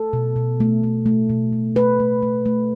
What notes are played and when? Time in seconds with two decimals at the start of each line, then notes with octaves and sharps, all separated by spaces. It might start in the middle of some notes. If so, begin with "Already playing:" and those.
Already playing: A4
0.13 B2
0.36 B2
0.60 A3
0.83 A3
1.06 A3
1.30 B2
1.52 B2
1.76 A3 B4
2.00 A3
2.22 A3
2.46 A3